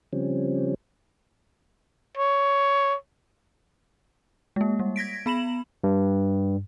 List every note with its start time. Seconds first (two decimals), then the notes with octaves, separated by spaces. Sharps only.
0.13 C#3 F3 G3 C4 C#4
2.17 C#5
4.56 G#3 A#3
4.79 G3
4.96 G#6 A#6 B6 D7
5.26 B3 B5 E7 F#7
5.84 G2